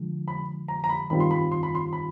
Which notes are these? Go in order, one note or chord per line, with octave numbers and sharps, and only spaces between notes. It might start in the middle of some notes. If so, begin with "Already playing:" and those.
Already playing: D3 F3 G#3
B5
A#5
A#5
B5
G2 D#3 G3 C4 F4 B5
C6
B5
C6
B5
C6
B5